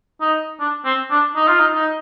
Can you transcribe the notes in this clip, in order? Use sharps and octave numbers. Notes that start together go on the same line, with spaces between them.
D#4
D4
C4
D4
D#4
F4
D#4
D#4